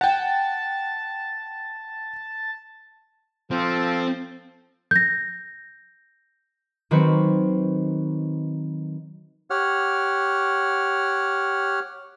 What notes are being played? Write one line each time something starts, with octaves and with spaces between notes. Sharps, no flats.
F#5 G5 A5
F3 C4 A4
G6 A#6
D#3 F#3 C4 F#4 B4 C#5
G4 C#5 F#5 F6